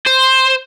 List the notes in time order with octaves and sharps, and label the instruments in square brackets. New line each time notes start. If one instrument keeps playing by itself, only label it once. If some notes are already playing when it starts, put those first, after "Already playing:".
[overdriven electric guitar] C5